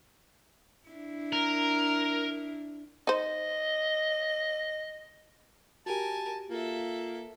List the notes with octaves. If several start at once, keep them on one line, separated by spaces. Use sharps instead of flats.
D4 E4
A#4
D#4 C5 D#5
F#4 G4 A#4 G#5 A5
A#3 F4 A4 E5